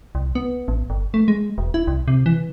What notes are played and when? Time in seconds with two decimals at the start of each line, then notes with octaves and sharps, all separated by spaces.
0.15 C2
0.35 B3
0.68 A1
0.90 G1
1.14 A3
1.28 G#3
1.58 E1
1.74 E4
1.87 C2
2.08 C3
2.26 E3